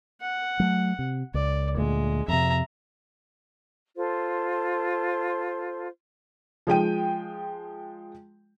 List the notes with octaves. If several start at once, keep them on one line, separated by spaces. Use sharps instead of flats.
F#5
F#3 A3
C3
C#2 D5
D2 A#2 G#3
F2 C3 E5 A#5
F4 A4 C5
F3 G#3 G5 D#7